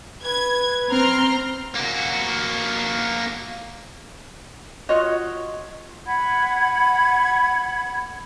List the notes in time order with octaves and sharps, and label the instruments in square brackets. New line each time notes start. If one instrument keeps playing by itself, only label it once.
[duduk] B4 [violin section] G#6
[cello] C4 [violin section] A#5 C6 F6
[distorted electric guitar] A#3 F#4
[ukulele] F4 F#4 C#5 D#5
[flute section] F#5 B5 G#6